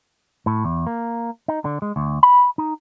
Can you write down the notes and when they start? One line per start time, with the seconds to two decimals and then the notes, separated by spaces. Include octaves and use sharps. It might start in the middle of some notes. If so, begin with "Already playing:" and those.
0.46 A2
0.65 E2
0.87 A#3
1.48 D#4
1.65 D3
1.82 G#3
1.96 D2
2.23 B5
2.58 D#4